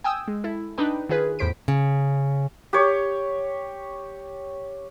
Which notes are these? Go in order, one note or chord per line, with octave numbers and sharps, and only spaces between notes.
G5 G#5 D#6 E6
G#3
E4 A4
D4 D#4 B4 G5
D#3 F4 G#4 B4
E2 A2 C5 B6 D7
C#3
G4 C#5